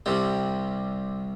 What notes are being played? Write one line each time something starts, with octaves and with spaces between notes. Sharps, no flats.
C2 C3 G3